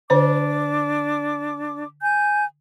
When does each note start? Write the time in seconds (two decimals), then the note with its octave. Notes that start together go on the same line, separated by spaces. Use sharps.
0.10 D3 D4 C5 C#5 D6
2.00 G#5 G6